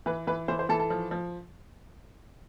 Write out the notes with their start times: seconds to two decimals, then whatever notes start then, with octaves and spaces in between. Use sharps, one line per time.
0.06 E3 B4
0.27 E3 B4
0.48 E3 C5
0.59 C5
0.69 E3 A4
0.80 A4
0.90 F3
1.11 F3